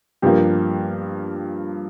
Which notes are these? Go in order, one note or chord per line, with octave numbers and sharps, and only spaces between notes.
G2 F3 A#3 G4